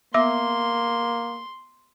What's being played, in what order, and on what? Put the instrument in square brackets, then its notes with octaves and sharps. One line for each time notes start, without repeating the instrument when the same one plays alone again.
[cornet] A#3 [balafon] B3 E5 D6 [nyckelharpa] C6